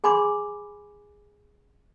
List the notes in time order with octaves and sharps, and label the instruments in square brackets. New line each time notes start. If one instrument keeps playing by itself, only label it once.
[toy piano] G#4 G#5 B5 C6 D6